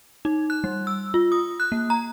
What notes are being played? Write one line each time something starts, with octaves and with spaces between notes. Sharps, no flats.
D#4
F#6
G3
E6
F4
D#6
F#6
A#3
A#5